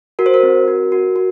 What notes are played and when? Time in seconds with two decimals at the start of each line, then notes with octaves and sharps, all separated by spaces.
0.19 F#4 A#4
0.26 C5
0.34 A#4
0.43 C4
0.68 F#4
0.92 F#4
1.16 F#4